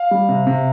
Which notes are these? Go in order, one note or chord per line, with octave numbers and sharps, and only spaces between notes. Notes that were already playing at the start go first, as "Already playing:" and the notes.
Already playing: F5
G3
C3
C3